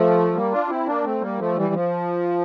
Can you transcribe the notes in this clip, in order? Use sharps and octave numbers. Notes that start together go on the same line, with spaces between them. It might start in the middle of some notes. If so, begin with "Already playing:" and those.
Already playing: F3 A3
G3 A#3
D4 F4
C4 E4
A#3 D4
A3 C4
G3 A#3
F3 A3
E3 G3
F3